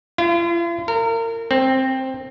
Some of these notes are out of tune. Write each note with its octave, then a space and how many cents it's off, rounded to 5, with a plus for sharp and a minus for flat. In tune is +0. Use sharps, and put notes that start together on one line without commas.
F4 -45
A#4 -30
C4 +10